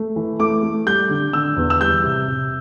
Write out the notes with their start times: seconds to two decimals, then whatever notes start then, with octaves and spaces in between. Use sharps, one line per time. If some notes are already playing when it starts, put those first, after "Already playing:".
Already playing: A3
0.16 E3
0.39 A3 D6
0.63 A3
0.86 G3 G6
1.09 D3
1.33 D3 E6
1.56 E2
1.70 E6
1.80 G3 G6
2.04 C3
2.28 C3